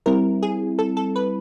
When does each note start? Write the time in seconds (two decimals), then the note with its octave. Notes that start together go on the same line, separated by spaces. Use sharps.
0.06 G3 C4 E4 A#4
0.43 G#4
0.79 A4
0.97 A4
1.16 B4